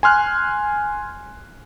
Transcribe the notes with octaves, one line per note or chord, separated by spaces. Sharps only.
G#5 C6 F6 F#6